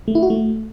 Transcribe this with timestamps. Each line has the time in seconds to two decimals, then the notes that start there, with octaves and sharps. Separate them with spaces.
0.08 A3
0.15 E4
0.23 F#4
0.30 A3